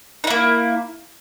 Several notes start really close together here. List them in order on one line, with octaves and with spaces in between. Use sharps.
D#4 E4 A#3